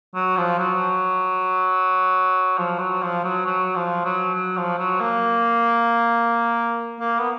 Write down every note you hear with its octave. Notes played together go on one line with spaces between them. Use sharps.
F#3
F3
F#3
F3
F#3
F3
F#3
F#3
F3
F#3
F#3
F3
F#3
A#3
A#3
B3